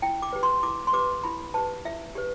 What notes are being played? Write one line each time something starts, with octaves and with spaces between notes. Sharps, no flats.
E4 G5
D6
G4 B4
C6
E4 D6
C6
G4 B4 D6
E4 B5
G4 B4 A5
E4 E5
G4 B4